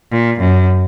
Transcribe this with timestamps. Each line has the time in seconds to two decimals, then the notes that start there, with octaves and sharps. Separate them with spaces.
0.12 A#2
0.40 F#2